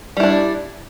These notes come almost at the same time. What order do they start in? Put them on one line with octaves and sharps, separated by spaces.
G3 E4 D4